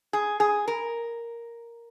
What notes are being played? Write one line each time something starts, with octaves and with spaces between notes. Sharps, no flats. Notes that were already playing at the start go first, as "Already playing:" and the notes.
G#4
G#4
A#4